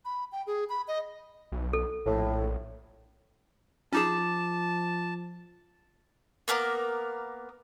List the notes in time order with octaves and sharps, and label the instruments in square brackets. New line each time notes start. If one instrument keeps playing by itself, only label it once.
[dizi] B5
G5
G#4
B5
D#5
[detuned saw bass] B1
[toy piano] A4
[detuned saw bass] A#1 [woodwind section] A2
[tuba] F3 [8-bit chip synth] C#4 D#4 G#4 [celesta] F4 D6 E7 [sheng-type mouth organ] A5
[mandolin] A#3 B3 A#4 D6